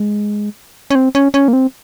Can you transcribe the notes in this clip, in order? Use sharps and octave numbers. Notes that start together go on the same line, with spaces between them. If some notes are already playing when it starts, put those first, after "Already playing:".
Already playing: G#3
C#4
C4
C#4
C#4
A#3
C4